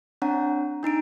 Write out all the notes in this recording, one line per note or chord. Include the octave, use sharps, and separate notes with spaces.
C4 D4 C#5 F#5 A#5
D4 D#4 A#5 D7